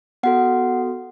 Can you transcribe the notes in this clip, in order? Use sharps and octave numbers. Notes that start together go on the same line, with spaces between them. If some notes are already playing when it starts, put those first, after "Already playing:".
B3 F#4 A4 F#5